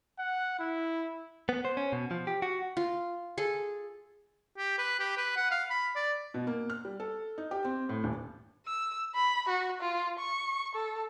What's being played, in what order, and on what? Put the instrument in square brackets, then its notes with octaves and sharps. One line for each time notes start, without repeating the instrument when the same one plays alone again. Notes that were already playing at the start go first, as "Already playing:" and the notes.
[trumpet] F#5
E4
[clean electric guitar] B3
C5
C#4
B2
F3
G4
F#4
[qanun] F4
G#4 A4
[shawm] G4
B4
G4
B4
F#5
F5
B5
D5
[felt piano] B2
A#3
F6
G3
A4
D#4
G4
C4
A2
D#1
[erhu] E6
B5
F#4
F4
C#6
A4